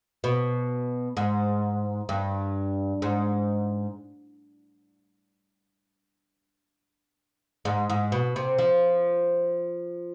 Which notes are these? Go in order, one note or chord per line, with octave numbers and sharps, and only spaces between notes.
B2
G#2
G2
G#2
G#2
G#2
B2
C3
F3